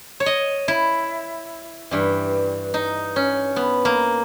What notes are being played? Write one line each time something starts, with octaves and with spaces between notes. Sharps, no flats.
C#5
D#5
E4
G2 E3
D#4
C#4
B3
A#3